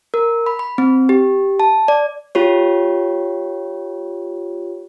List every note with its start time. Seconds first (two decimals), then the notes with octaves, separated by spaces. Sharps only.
0.14 A#4
0.46 B5
0.59 B5
0.78 C4
1.09 G4
1.60 A5
1.88 D5
2.35 F4 G4 C#5